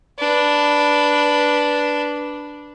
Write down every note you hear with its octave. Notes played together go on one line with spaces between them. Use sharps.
D4 B4